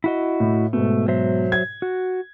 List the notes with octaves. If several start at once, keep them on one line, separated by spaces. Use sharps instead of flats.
E4 F#4 D#5
A2
G#2 B2 A3
F#3 C5 E5
G#6
F#4